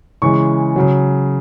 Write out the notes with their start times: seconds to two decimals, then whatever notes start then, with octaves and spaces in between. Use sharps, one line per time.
0.22 C#3 E3 G#3 C#6
0.76 C#3 F#3